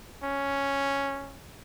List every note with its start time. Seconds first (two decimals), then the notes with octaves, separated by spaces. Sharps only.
0.23 C#4